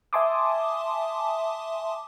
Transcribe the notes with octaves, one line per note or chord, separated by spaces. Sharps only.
E5 G#5 A5 C6 D6 D#6